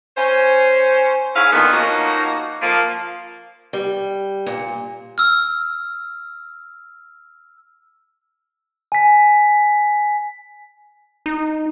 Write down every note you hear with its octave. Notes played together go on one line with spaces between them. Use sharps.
C#4 C5
G#2 C#4 E4 G#4 F5
A#2 D3 D#3 A#3 B3
F3 A#3 C#4 D#4 F#4
F3 A#3
G3
A#2
E6 F6
G#5 B6
D#4